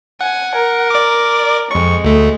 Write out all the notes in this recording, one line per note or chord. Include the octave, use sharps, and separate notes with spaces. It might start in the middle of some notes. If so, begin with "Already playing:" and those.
F#5 G#5
A#4
D5 D6
F2 G#3 C#6
D2 A3